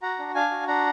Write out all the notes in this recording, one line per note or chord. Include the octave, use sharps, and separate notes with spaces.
F#4 F#5 A#5
D4
D4 F5 G#5
F#4
D4 F#5 A#5